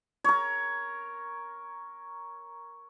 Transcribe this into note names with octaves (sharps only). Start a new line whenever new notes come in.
A#4 C#5